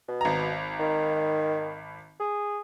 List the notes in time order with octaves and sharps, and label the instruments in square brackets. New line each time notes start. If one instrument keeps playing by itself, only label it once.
[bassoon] B2
[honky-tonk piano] G#1 A#5
[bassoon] D#3
G#4